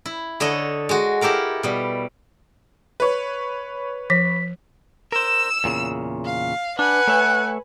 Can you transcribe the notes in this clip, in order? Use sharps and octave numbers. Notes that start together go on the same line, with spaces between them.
E4
D3 A4 C#5 D#5
G#3 F#4
E4 G4 A4 A#4 F5
B2 G3
B4 C#5
F3 B6
A#4 C5 E6 E7
E2 A#2 C#3
F5
D4 B4 F#5 G#5
A3 C#5 E5